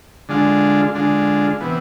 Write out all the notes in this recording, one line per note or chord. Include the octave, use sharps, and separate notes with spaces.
D3 G#3 D4 F4
D3 G#3 D4 F4
C3 E3 B3